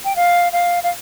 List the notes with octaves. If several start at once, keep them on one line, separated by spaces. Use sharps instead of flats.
G5
F5
F5
F5